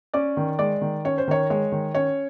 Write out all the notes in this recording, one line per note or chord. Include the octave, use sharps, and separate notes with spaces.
C#4 D5
D#3
G#3 D5
D#3
C#4 C#5
C5
D#3 C#5
G#3 C#5
D#3
C#4 C#5